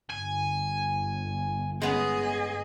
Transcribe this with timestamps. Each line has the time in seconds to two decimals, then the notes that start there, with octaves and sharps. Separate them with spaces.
0.10 G1 G#5
1.82 G#3 B3 C#4 G#4 D#5